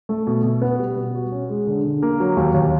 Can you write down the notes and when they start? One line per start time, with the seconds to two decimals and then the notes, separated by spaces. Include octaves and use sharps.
0.09 A3
0.27 B2
0.43 B2
0.62 B3
0.79 G3
0.96 B2
1.15 F#4
1.32 C#4
1.49 G#3
1.67 D3
1.84 D3
2.02 A#3
2.20 F#3
2.37 D#2
2.54 D#2